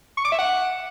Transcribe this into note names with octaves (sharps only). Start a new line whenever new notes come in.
C#6
D6
E5
F#5